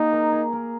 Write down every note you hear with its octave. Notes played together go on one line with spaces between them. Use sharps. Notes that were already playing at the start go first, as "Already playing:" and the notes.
Already playing: A#3 D#4 G#4
A#4
G#4
A#4